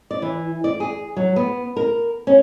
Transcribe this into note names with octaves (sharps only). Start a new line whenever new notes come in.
D5
E3
D5
G#4
F#3
B3
A#4
C#4